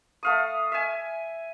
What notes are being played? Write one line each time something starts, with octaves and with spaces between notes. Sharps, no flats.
A3 F5 D#6
E5 G#5